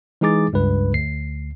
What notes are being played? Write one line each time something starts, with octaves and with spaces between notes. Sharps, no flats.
E3 G#3 D#4 G#4 D6 A6
C#2 G2 B4
D2 C7